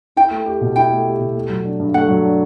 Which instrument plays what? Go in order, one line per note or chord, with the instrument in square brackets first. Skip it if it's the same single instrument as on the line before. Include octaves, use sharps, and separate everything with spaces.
[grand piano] E4 [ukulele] G5
[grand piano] A3
G4
B2
[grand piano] E4 [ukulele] G5
[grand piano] A3
G4
B2
A3
F#3
D4
G2
[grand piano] A3 [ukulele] F#5
[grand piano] F#3
D4